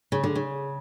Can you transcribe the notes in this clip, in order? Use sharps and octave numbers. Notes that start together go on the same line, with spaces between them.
C#3
D3
C#3